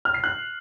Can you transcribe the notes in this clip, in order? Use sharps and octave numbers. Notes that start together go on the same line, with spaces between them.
F6
C7
F#6